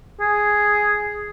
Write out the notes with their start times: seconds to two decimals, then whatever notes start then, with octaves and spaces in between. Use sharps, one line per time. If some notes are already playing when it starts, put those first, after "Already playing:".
0.20 G#4